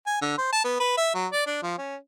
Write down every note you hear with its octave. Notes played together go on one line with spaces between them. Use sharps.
G#5
D3
C5
A5
B3
B4
E5
F#3
D5
D4
F3
C#4